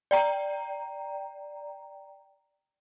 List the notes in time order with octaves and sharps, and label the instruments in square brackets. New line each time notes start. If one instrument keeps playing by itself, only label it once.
[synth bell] D5 G5 A#5